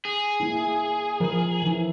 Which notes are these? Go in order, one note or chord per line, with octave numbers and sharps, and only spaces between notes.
G#4
A#3 E4
F3 A#4
E3 E4